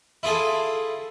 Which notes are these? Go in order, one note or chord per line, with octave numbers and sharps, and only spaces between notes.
E4 F4 G#4 A4